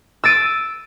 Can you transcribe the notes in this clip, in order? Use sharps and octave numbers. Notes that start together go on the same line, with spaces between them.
E6 A6 D7 D#7